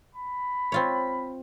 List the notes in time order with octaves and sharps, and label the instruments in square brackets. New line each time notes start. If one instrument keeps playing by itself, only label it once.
[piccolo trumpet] B5
[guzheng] C4 F4 C#5